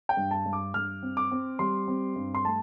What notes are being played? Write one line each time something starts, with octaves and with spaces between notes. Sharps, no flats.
G5
G2
A5
G2
D6
G2 F6
C4
D6
C4
G3 C6
C4
G2
C6
A3 A5